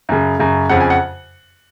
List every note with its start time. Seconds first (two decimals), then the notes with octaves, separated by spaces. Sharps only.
0.09 F#2 C#3
0.39 F#2 C#3
0.69 F2 C#3 F#5
0.80 G#5
0.90 F#5